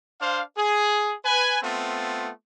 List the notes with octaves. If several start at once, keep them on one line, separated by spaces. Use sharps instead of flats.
D4 C5 F5
G#4
B4 G#5
A3 B3 C4 F4